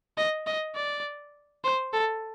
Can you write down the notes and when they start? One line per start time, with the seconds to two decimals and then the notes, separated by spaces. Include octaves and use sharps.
0.18 D#5
0.47 D#5
0.76 D5
1.64 C5
1.93 A4